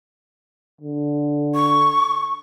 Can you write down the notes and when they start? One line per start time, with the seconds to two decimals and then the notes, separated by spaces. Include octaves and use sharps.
0.81 D3
1.55 C#6